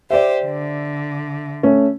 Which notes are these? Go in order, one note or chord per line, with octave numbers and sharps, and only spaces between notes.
G4 C5 D5 E5
D3
A3 C#4